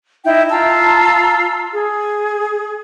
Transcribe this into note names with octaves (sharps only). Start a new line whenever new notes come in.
D#4 E4 E5 G5
F4 A5 A#5 E6
G#4